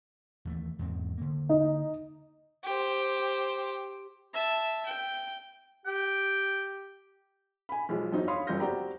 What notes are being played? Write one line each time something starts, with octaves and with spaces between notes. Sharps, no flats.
D#2 E3 A3
E2 G#2 C4
D3 A#3
D#4
G4 C5
E5 A5
G5
G4 G5
G#5 B5
B1 F3 G#3
F#2 F#3 C4 D#4
C#5 F5 B5 C6 D#6
F#1 G2 F3 G4 G6 A#6
C4 F#4 G4 D5 G5 A#5